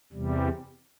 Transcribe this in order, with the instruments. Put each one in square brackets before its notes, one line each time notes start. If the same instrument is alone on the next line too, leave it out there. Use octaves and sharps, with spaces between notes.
[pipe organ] E2 C3 G3